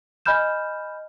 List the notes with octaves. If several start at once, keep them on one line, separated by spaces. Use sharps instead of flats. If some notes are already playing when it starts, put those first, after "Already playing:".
D#5 G#5 B5 F6 G6 E7